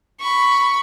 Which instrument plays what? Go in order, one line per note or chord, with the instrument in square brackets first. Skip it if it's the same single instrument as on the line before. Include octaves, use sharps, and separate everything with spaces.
[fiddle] B5 C#6